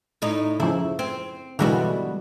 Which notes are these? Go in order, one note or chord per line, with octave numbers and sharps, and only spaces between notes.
A2 D#4
C#3 F3 E4
C4
B2 D3 E3 G3 G#3 F#4